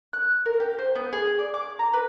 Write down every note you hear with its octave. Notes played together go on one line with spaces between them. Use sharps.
F#6
A#4
G4
C5
B3
G#4
D5
D6
A#5
B4